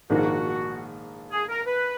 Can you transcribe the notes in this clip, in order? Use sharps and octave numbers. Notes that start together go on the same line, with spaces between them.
A#1 G#2 D#3 A#3 F#4
G#4
A#4
B4